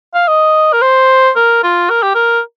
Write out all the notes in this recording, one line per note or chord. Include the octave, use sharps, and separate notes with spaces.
F5
D#5
A#4
C5
A#4
F4
A#4
G4
A#4